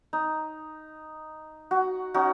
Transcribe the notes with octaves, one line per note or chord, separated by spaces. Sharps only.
D#4
F#4
C#4 D#4 F#4